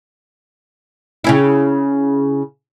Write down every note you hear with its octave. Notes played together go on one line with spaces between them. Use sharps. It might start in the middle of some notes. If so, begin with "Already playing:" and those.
C#3 C#4 E4